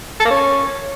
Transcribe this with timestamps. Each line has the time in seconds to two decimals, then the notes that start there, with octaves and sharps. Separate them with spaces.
0.20 A4
0.25 A#3
0.30 C#4